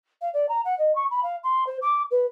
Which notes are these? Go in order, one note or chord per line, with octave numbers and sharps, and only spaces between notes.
F5
D5
A#5
F#5
D#5
C#6
B5
F5
C6
C5
D6
B4